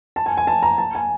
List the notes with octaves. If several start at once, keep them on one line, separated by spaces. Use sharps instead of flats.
A5
G#5
G#5
A5
A#5
A5
G#5